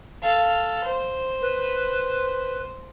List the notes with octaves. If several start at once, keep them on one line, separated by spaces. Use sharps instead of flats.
A4 F5
C5
B4